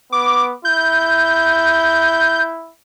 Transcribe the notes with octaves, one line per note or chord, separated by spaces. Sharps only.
B3 D6
E4 G6